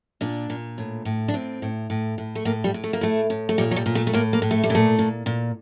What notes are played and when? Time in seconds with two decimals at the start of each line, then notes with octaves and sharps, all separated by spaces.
0.21 A#2 D4
0.50 A#2
0.78 A2
1.05 A2
1.28 D4
1.34 A2 C4
1.62 A2
1.90 A2
2.18 A2
2.35 A3
2.45 A2 A#3
2.64 G3
2.74 A2
2.84 A3
2.93 A#3
3.01 A2 A3
3.30 A2
3.49 A3
3.58 A#2 G3
3.71 F#3
3.76 G3
3.86 A#2
3.95 A3
4.07 A3
4.13 A2 A#3
4.33 A#3
4.42 A2
4.51 A3
4.64 G3
4.70 A#2
4.75 A3
4.99 A#2
5.26 A#2